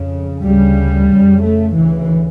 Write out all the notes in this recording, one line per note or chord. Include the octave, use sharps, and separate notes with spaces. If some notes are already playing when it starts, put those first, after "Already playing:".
Already playing: F2 C#3
D2 C#3 G3
F2 C#3
A3
D2 C#3 E3